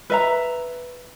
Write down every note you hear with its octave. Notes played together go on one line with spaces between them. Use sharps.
B4 E5 A#5